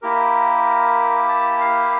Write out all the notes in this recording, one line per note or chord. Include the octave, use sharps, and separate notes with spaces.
A#3 E4 G4 A#4
A5
F5